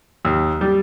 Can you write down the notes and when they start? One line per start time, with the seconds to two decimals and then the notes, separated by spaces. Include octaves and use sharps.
0.25 D#2
0.61 G3